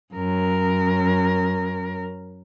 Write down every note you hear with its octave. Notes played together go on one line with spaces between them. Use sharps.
F#2 A#4